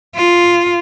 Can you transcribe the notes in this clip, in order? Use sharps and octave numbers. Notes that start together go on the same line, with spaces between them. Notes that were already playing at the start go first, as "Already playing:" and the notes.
F4